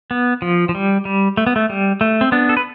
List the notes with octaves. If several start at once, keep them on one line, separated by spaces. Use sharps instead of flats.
B3
F3
F3
G3
G3
A3
B3
A3
G3
A3
C4
B3 D4
A4
B4